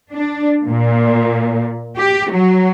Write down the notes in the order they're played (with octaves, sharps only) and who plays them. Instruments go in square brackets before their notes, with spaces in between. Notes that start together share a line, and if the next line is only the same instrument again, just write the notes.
[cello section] D4
A#2
G4
F#3